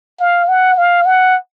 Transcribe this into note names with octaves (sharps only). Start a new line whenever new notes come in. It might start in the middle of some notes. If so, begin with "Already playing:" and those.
F5
F#5
F5
F#5